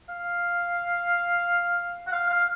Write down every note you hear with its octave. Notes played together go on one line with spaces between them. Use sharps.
F5
F#5
F5
F5